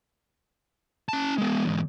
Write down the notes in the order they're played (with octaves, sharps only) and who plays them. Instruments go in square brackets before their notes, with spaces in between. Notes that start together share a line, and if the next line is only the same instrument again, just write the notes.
[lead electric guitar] C#4 A5
G#3 B3
E2 G#2